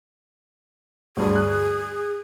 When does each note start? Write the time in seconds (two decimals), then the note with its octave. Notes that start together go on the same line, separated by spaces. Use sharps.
1.17 D2 G2 G#4
1.36 F#6